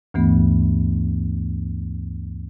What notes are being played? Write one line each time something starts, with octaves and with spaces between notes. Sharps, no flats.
D2 G2 E3 A3 B3